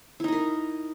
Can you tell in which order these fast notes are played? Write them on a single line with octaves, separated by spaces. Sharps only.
E4 D#4 D#5 A#4